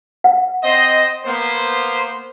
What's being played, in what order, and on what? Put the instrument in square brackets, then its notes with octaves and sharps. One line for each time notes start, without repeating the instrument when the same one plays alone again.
[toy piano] F#5
[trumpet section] C4 C5 D#5
A#3 B3 C5